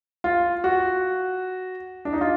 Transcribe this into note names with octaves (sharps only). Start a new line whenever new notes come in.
F4
F#4
D4
D#4
F4